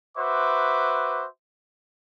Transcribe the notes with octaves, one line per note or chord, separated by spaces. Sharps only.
F#4 B4 C5 E5 D6